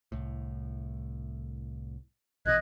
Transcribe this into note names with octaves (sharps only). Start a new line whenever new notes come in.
C2 A2
A#1 B2 E3 D#5 F#6 G#6